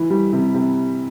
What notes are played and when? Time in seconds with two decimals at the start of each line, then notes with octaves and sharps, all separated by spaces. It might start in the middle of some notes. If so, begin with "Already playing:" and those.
Already playing: E3
0.10 G3
0.33 C3
0.54 C3